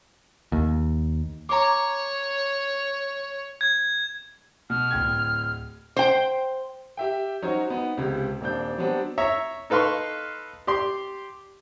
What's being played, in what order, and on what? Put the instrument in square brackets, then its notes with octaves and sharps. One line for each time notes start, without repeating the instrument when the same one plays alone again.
[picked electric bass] D#2
[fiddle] C#5 [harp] A#5 D6
[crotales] G#6
[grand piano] B2 [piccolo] F6
[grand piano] D1 G5 G#6
[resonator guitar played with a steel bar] C5 G5
[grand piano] G4 E5 G5
F#3 C#4 D#4 F#4 C5 C#5
B3 D#4
C#2 C3
D#1 C4 D4 G6
F#3 G3 B3 C4 D4
[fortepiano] C#5 E5 A#5 C#6
D#4 A4 B4 F5 C6 C#6
G4 D5 C6